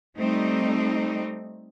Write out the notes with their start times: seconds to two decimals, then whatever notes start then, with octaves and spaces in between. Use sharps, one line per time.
0.17 G3 A3 C4 D#4